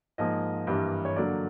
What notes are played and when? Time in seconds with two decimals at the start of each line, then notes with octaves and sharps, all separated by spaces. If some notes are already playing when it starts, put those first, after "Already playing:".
0.18 G#2 F3 A#3 D#5
0.67 G2 E3 G3 A#3 D4
1.05 C#5
1.16 D3 F#3 A#3 D5